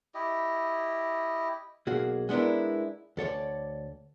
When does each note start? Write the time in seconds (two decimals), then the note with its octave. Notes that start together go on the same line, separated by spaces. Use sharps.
0.15 E4 G4 D#5
1.87 B1 A#3 F#4 G#4
2.29 G#3 B3 D4 E4 A#4
3.17 D2 A4 C#5 D5